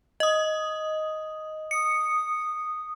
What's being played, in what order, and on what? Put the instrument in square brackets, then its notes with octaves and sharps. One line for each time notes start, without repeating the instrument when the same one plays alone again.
[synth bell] D#5 D#6
[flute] D#6 [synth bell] C#7